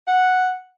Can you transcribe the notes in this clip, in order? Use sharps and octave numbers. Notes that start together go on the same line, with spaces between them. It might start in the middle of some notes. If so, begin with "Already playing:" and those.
F#5